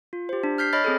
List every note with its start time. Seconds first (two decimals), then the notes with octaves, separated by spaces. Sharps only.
0.13 F4
0.29 G4 C5
0.44 D4
0.58 F6 G6 B6 C7
0.73 C#5 D#5 B5 F6 A6
0.84 C4 G#4 A4